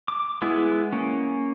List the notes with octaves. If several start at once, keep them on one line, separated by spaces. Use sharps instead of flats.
D6
G#3 B3 E4 G#4
A#3 C#4